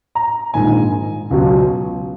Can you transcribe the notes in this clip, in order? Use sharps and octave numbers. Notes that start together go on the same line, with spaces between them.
A#5
A#1 G#2 D#3 G#5
C#2 B2 F#3